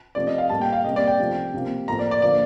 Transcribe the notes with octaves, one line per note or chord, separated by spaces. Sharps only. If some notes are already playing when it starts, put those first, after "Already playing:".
C3 F3 A3 D5
D#5
F5
A2 G3 A#3 A5
G5
F5
C3 G3 A#3 D#5
D5
G5
C3 F3 A3
C3 F3 A#3
A2 F3 A#3 A#5
D5
D5
D3 F3 A#3 D5